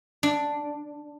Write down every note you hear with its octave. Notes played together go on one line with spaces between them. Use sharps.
D4